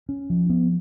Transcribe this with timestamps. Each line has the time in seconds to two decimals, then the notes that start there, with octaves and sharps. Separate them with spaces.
0.09 C#4
0.30 F3
0.50 B3